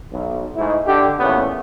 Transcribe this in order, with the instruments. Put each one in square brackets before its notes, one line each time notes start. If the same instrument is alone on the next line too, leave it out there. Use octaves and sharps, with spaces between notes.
[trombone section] B1
G#2 G#3 A3 E4
D3 G4
E2 A#2 A3 B3 C#4